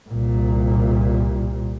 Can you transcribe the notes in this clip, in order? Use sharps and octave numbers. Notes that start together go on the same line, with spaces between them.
C2 A#2